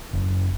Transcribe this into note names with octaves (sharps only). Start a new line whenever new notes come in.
F#1